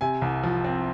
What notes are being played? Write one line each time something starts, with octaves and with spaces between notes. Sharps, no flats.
C3 G#5
C2
F3
C4